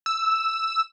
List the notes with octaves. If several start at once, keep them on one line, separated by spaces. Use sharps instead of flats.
E6